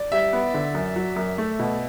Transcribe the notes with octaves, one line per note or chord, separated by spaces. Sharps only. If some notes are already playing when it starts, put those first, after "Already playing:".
Already playing: D5
G3 E5
B3
D3
F#2
F#3
F#2
A3
B2